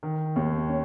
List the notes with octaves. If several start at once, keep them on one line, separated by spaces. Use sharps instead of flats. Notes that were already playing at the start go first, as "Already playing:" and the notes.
D#3
D#2
C#4